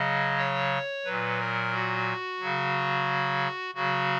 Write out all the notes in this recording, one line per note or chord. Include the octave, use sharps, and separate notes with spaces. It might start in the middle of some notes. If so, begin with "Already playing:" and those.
Already playing: C#3 F#3 D#5
C#5
A#2 F#3 B4
A#4
F#4
C#3 F#3
C#3 F#3 F#4